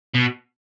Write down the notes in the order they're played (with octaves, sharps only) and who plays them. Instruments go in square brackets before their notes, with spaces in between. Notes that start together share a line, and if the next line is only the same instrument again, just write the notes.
[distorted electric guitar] B2